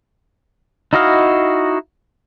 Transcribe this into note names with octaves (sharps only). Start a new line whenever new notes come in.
D#4 E4 F#4 D#5 F5